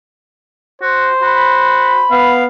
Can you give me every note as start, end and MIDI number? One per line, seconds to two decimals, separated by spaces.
0.82 1.08 66
0.82 2.13 72
1.22 2.03 66
1.22 2.48 83
2.11 2.47 59
2.11 2.44 77